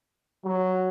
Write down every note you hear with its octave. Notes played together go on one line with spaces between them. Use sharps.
F#3